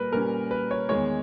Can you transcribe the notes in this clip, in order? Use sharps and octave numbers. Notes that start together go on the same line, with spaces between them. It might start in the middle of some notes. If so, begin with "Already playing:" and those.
Already playing: A#2 G3 A#4 B4
A#2 G3 C#4 A#4
B4
C#5
E2 D#3 G#3 C#5